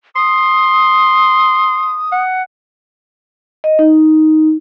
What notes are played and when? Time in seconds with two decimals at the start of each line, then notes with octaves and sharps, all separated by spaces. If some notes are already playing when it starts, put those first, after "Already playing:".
0.16 C6 D#6
2.12 F#5
3.64 D#5
3.79 D#4